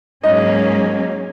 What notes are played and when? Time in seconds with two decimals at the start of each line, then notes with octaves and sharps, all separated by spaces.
0.24 G#2 F#3 A#3 C#4 D#4 D#5